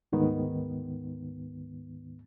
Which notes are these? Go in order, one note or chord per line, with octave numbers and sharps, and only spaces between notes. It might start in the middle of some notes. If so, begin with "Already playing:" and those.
D2 G#2 D#3 B3